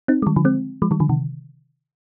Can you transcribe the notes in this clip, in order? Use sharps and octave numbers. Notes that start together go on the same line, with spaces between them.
C4 D#4
G#3
D#3 G3
D3 F3
G#3 C4
F3 G#3
D#3 G3
D3 F3
C3 D#3